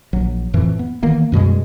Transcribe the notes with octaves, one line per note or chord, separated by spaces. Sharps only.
A#1 F#3
F2 A2 E3 F3
B3
D#3 E3 A#3 B3
F#2 B2 G3 G#3